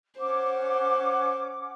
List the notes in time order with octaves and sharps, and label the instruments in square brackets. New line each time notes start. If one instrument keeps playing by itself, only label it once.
[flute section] C#4 F#5 D6 [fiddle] C5